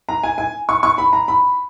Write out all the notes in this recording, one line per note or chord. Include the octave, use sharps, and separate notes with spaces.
A#5
G#5
G#5
C#6
C#6
B5
A#5
B5